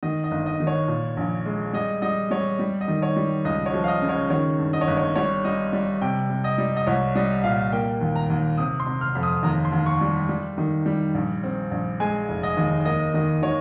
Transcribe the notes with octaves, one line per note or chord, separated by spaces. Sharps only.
D#3 D#5
D#5
G1
D#5
D#3
C#5
A#2
A#1
G#3
G3 D#5
G3 D#5
G3 C#5
G3
D#5
D#3
C#5
G3
C#2 D#5
C#5
F3
F5
D#5
C#3
C#5
D#3 C#5
G2
D#5
C#5
G1
C#5
G3 C#5
G3 D#5
G3
C3 G5
C3
D#5
G3
D#5
C2 C#5
G3 D#5
A#2 F5
A#3 G5
D#2
A#5
D#2
C3 D#6
C6
C3
F6
F2
D#6
D#2 A#5
C6
D#2
C#6
G3
G3
D#3
G3
A#1
C4
A#1
G#3 G#5
F1
D#5
D#2
A#3 D#5
D#3 D#5
D#3 C#5